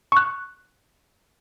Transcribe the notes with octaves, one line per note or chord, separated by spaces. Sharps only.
C#6 F#6